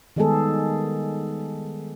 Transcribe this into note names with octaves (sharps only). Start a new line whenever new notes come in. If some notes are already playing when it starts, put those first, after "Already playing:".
D#3 G3 G#3 B3 G#4 A4